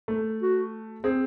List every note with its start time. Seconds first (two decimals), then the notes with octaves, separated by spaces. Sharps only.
0.08 A3
0.42 F#4
1.04 C4 G#4